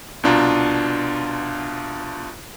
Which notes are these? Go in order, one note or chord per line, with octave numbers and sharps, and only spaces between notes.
C2 B2 D4 F4 A#5